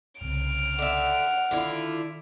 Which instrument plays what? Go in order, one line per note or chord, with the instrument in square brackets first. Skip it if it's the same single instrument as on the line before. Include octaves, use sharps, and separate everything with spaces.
[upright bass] C2 C#3 [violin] F6 D7
[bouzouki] D3 E5 [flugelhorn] F#5
[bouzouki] D3 E4 F4 [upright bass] D#3